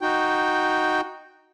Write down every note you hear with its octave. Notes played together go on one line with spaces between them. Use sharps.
D#4 F#4 G5